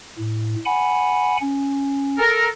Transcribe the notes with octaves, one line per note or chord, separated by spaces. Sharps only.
A2
F#5 G#5 B5
C#4
A4 A#4